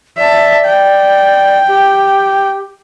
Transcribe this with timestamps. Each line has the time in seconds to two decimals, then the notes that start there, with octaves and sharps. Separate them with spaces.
0.17 D5 E5 A5
0.65 G5
1.68 G4